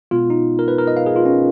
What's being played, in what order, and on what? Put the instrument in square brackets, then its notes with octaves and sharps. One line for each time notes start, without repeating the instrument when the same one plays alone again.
[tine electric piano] B2 G#3 B3 F4
D#4
A#4
B4
A#4
D#5
F5
G#4
F4
C#4